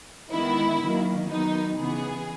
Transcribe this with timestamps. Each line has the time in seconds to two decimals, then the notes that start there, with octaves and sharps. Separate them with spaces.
0.31 D#3 G#3 B3 E4
0.79 D#3 F#3 A#3
1.28 D#3 F#3 B3 D#4
1.76 C#3 E3 B3 G#4